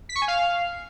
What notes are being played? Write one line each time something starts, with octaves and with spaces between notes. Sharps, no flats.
B6
C#6
G#5
F5